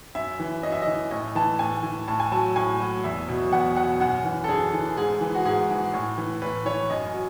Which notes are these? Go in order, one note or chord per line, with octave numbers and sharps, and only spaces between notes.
F#2 E5
E3
F#2 D#5
E5
D#5
E3
A2 D#5
E3 A5
A2 G#5
E3
A2 A5
G#5
F#3 A5
A2 G#5
F#3
E2 E5
B2 F#3
E2 F#5
B2 F#3 F#5
F#2 F#5
E3
A4
F#2 G#4
E3
G#2 G#4
E3
F#4
G#2 G#4
E3
A2
E3
A2 B4
E3 C#5
F#2 D#5
F#3